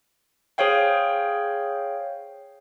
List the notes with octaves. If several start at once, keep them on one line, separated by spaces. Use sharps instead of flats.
G#4 C5 C#5 F5 G5